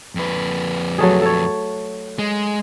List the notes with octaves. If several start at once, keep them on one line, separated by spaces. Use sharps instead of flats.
F2 B4
F#3 A3 G#4
A4 C#5
G#3